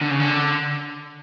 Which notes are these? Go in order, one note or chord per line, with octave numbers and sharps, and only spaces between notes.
D3
C#3
D3